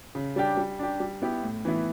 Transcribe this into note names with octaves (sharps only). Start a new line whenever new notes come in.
C#3
G3 D4 G4
G3
D4 G4
G3
B3 E4 G4
A2
E3 B3 E4